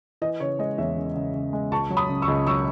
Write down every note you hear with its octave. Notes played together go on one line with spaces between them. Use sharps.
E3 D#5
C#3 C#5
G#3 D#5
E2 C#5 E5
C#3
C#3
C#3
G#3
C#2 A5 C#6
F#3
B5 D#6
C#3
C#6 E6
C#2
F#3 C#6 E6